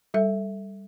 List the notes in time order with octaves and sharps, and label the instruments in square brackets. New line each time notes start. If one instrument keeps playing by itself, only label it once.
[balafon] G3 A4 E5